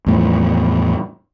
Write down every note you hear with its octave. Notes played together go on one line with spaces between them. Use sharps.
E2 A2 F3